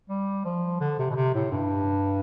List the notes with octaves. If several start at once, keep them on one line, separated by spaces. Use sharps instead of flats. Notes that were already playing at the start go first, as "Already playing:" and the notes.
G3
F3
D3
C3
B2
C3
A2
G2